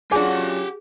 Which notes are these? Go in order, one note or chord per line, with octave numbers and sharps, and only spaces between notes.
F#3 C#4 D4 F4 G4 G#4 F#5 G#5